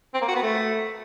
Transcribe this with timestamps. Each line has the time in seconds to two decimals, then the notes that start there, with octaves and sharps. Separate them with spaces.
0.14 C4
0.21 A#3
0.28 F#4
0.35 B3
0.43 A3